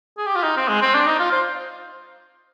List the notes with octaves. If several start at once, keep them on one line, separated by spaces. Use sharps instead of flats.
G#4
G4
F4
D#4
C4
G#3
C4
D4
D#4
F4
C5